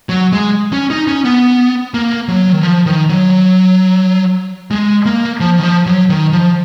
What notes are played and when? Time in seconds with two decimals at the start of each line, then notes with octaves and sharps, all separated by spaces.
0.09 F#3
0.32 G#3
0.73 C#4
0.90 D#4
1.07 C#4
1.25 B3
1.94 A#3
2.28 F#3
2.52 D#3
2.63 F3
2.86 D#3
3.09 F#3
4.71 G#3
5.06 A#3
5.40 F3
5.58 D#3
5.63 F3
5.86 F#3
6.09 D#3
6.33 F3